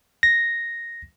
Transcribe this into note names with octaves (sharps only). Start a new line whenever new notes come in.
A#6